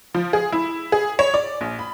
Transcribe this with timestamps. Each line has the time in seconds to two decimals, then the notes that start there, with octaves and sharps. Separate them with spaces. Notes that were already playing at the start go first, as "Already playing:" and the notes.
0.15 F3
0.33 G#4
0.53 E4
0.92 G#4
1.19 C#5
1.34 D5
1.61 A#1
1.79 B5